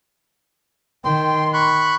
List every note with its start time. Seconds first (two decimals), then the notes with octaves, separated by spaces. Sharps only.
1.05 D#3 G5 C6
1.53 B5 C#6 F#6